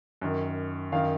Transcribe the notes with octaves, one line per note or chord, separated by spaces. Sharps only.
F#2 D#3
F#2 D#3 F5